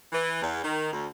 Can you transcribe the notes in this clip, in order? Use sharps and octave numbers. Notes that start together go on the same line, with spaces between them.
E3
E2
D#3
D2